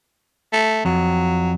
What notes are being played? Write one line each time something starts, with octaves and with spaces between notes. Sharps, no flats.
A3
F2 F#3